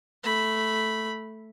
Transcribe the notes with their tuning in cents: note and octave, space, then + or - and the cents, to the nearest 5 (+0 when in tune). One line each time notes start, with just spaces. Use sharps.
A3 +0 B5 +0